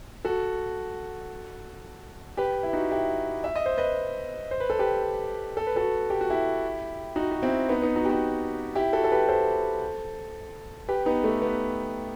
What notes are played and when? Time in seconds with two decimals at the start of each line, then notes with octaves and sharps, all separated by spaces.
0.25 F#4 A4
2.37 G4 B4
2.63 E4
2.73 D#4 F#4
2.91 E4 G4
3.44 E5
3.56 D#5
3.66 C5
3.77 B4 D#5
4.51 C5
4.60 B4
4.70 A4
4.79 G4 B4
5.57 A4
5.67 B4
5.76 F#4 A4
6.10 G4
6.21 F#4
6.30 E4 G4
7.16 D#4 F#4
7.32 F#4
7.43 C4 E4
7.69 B3 D#4
7.82 B3 D#4
7.96 D#4 F#4
8.05 G4
8.09 D#4 F#4
8.75 E4 G4
8.93 F#4 A4
9.04 A4
9.12 G4 B4
9.28 A4 C5
10.88 G4 B4
11.06 B3 D#4
11.24 A3
11.42 B3